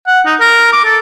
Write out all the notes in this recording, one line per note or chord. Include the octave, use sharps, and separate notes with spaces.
F#5
D#4
A#4
D6
A4